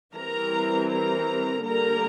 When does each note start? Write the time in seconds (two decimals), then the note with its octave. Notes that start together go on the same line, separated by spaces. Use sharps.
0.15 E3 G3 C4 A#4 A#5
0.90 A#4 A#5
1.65 D3 G3 A#3 A#4 A#5